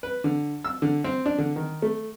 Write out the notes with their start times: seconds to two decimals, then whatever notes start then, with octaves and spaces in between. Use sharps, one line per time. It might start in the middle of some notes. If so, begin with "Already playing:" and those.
0.03 B4
0.24 D3
0.64 E6
0.82 D3
1.04 C4
1.26 D4
1.38 D3
1.56 D#3
1.82 A3